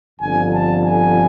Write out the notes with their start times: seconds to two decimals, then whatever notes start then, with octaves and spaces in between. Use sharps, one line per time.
0.19 G1 F2 D3 G#5
0.53 A5
0.85 G#5